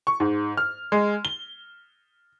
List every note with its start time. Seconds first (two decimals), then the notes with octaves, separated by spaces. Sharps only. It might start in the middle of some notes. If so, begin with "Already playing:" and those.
0.07 C#6
0.20 G#2
0.57 F6
0.92 G#3
1.25 G7